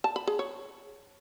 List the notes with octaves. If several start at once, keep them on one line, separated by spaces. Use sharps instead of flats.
A5
B5
G#4
C#5